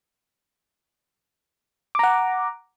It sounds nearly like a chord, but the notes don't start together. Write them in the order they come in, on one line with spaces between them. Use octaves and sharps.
D6 A#5 F#5